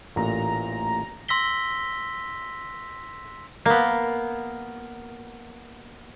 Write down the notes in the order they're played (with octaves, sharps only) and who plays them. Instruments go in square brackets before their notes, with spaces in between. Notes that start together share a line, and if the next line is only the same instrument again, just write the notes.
[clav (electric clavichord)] A1 A#2 [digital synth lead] A#5
[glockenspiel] C6 E6 A#6 B6 G7
[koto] A#3 B3